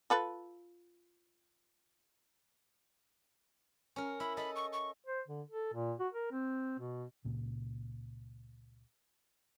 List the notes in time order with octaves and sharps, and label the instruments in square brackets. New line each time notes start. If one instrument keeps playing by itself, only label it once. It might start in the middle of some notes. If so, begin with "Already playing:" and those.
[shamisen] F4 A4 B4
[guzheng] C#4 A#4
[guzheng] E4 [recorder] B5
[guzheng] A4 D#5 [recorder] B5
[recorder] C#6
C#6
[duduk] C5
D3
A4
A#2
F#4
A#4
C4
B2
[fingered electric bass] C#2 A#2 C#3